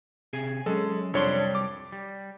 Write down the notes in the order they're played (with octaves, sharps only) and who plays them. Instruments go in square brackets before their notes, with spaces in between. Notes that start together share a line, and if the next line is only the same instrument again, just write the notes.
[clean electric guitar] C3 G#4 G#5
[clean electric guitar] F#3 C#4 [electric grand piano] G#3 A4
[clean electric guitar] C2 G3 C6 [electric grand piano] F2 D4 C#5
[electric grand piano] D6
[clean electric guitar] G3